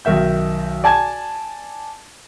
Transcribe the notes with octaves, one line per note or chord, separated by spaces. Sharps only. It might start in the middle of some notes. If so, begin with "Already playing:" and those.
B1 D#3 A#4 E5 G6
D5 G#5 A5 G#6